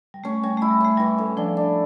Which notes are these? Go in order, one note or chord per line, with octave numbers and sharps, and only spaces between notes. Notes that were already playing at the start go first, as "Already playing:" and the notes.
G3
A3 C#4
G3 C#4
A3 E4
G3
A3 C#4
E3 G3
A2
F3 D4
D4